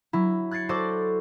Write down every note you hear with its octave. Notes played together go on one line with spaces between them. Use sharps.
F#3 E4
F#6 G#6 A6 C7 C#7
F#4 A4 C5 D5 C6 D6